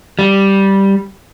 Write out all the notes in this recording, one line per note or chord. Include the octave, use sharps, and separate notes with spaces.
G3